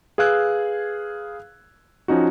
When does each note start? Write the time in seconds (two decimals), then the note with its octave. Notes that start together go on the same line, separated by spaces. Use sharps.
0.18 G#4 B4 F5 E6 F#6 G#6
2.08 F3 C#4 D#4 F#4